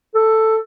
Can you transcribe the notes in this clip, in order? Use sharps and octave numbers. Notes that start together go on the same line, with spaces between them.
A4